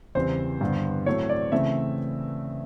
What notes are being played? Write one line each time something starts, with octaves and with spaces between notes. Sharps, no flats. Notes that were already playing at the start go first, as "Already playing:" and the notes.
E2 C#3 E3 G3 C4 C5
G2 D3 G3 B3
A2 F#3 A3 C4 C#5
D5
C#3 E3 A3 C4 E5